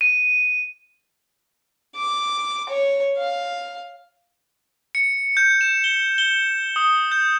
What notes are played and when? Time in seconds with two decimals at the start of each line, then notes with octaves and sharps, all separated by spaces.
0.01 D#7
1.96 D6
2.69 C#5
3.17 F5
4.95 C#7
5.37 G6
5.61 E7
5.84 G7
6.18 G7
6.76 D#6
7.12 G6